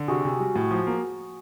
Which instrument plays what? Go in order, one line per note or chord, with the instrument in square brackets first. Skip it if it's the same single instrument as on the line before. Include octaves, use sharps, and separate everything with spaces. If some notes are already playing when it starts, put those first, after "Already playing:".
Already playing: [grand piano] D3
[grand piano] C3 [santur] F#4 G#4
[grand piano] C3
G3
A2
F3
A#3